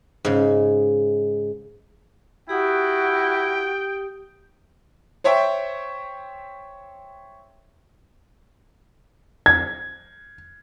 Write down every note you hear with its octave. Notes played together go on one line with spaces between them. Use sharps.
G#2 C#3
E4 F#4 G4 G5 D#6
C5 C#5 E5 G5
G#6